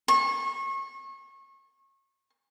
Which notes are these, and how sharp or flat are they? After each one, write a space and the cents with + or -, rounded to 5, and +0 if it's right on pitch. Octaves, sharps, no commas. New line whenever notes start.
C#6 -30